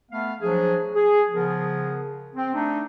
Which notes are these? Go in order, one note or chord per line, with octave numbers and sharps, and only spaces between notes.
A3 B3 F5
F3 F#3 D4 G#4
G#4
C#3 F3 B3 G#4 A#4
C4
A3 D4 D#4